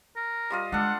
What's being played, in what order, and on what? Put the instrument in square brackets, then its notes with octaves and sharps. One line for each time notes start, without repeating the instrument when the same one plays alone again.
[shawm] A#4
[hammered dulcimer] G3 F4 D#5
[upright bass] G#3 [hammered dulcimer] D4 A4 [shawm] F#5